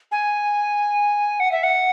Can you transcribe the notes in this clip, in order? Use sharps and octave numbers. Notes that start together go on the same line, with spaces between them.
G#5
F#5
E5
F#5